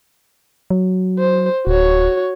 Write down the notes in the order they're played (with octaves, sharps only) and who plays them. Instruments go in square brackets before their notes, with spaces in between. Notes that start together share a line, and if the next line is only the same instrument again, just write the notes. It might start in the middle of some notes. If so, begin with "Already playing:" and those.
[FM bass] F#3
[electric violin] C5
[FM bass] D1 [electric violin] F#4 C#5